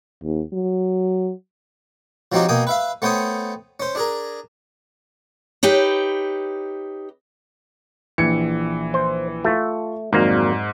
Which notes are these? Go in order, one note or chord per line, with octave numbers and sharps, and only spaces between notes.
D#2
F#3
F3 F#3 C4 D#4 F#4 G4
B2 A#3 G5 G#5 D#6
B4 E5 F5
A3 B3 C5 C#5 G5 D#6
C#4 C5
D4 G#4 A#4
D#4 G4 B4 C#5
A#1 E3 G#6 C#7
C5
A3 F4 C#6
G#1 F2 G#2 F#3 A#3 D5